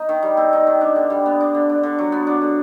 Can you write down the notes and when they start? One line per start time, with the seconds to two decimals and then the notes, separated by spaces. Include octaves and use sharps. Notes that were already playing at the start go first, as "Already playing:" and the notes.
Already playing: D#4
0.09 D#3
0.23 G3
0.37 C4
0.53 D#4
0.67 D#3
0.81 D4
0.96 D3
1.10 G3
1.26 B3
1.40 D4
1.55 D3
1.70 D4
1.83 D3
1.99 F#3
2.12 B3
2.27 D4
2.41 D3